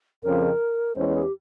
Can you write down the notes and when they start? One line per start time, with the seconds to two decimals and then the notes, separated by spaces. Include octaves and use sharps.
0.23 F2 C#3 F3 A#4
0.95 E2 E3 G#3 C#4 C5
1.13 G#4
1.23 G4